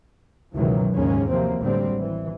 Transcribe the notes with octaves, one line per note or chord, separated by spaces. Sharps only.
C#2 F#2 B2 D#3 E3 F#3
D#2 G#2 C#3 G#3 A#3 C#4
C3 F3 F#3 A#3 C4
A1 D3 F#3 G3 C4
E3